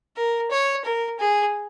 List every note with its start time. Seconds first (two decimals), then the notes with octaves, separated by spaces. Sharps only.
0.16 A#4
0.51 C#5
0.85 A#4
1.19 G#4